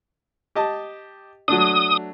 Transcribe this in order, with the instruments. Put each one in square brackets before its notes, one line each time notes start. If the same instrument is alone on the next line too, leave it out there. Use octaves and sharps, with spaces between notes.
[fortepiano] G4 D#5 A5
[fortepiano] F#3 A3 D4 [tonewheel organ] D#6